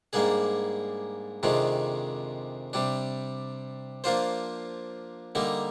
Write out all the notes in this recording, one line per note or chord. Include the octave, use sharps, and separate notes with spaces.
G#2 G3 A#3 D4 G#4
F2 C3 D#3 G#3 D4
C3 G3 D4
F3 A#3 D4 F4 C5
D3 G3 A#3 D#4